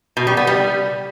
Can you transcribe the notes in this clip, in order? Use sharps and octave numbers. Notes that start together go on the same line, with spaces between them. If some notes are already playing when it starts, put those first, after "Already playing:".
B2
G3
B3
G3